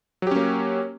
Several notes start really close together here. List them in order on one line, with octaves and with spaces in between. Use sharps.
F#3 G4 C#4 A#3